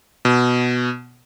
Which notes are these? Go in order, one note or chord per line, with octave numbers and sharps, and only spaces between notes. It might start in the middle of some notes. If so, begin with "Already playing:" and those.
B2